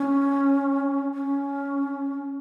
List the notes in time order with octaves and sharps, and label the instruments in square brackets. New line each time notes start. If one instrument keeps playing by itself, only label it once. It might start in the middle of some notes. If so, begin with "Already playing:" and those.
Already playing: [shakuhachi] C#4
C#4